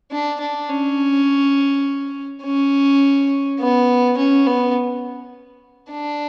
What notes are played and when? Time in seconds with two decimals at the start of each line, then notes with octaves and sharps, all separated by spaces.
0.11 D4
0.40 D4
0.69 C#4
2.43 C#4
3.60 B3
4.18 C#4
4.47 B3
5.91 D4